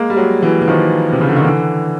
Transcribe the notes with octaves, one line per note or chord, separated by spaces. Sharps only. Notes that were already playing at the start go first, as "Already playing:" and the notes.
Already playing: G#3 A#3
G3
F#3 G#3
E3 F#3
E3
D#3 F3
C3
C#3
D3
D#3
D3 E3